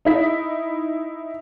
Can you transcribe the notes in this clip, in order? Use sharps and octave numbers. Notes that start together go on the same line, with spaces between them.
D#4 E4 B6